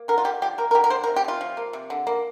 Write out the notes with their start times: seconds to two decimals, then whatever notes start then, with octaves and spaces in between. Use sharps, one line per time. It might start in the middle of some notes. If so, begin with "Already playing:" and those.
Already playing: A#3
0.08 D3 A#4
0.18 F4
0.24 D3 G4
0.42 F3 G4
0.58 A#3 A#4
0.71 A#4
0.74 D3 G4
0.84 A#4
0.90 A#3 C5
1.04 A#4
1.08 C3
1.16 G4
1.24 C3 F4
1.41 F3
1.57 A#3
1.73 C3
1.90 D3
2.07 A#3